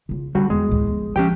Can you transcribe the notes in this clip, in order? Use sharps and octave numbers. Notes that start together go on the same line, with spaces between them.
C#3 F4
D3 G3 C#4 F#4
E2 G#3
D2 A2
G1 F2
F3 G#3 C#4 G4 G5